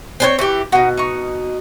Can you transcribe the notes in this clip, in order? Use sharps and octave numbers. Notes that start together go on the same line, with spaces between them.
C4 D4 C#5
E3 G4 C#6
B2 D#4 F#4
D#4 C#6